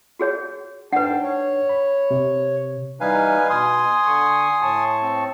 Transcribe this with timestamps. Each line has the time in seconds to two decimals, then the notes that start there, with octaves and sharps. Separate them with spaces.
0.19 F#4 G#4 C#5
0.92 G#2 D4 B4 F#5 G5 A5
1.22 C#5
1.69 B5
2.11 C3
3.01 E3 G3 D#4 B4 F5 G#5
3.50 B2 G#5 C6 D#6
4.06 D3 C#6
4.62 A2 A5 C#6
5.02 C4